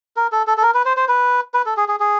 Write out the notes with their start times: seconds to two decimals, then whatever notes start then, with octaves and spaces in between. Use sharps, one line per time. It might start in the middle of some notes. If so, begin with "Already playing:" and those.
0.16 A#4
0.32 A4
0.47 A4
0.58 A4
0.63 A#4
0.74 B4
0.86 C5
0.97 C5
1.08 B4
1.54 B4
1.66 A4
1.77 G#4
1.88 G#4
2.00 G#4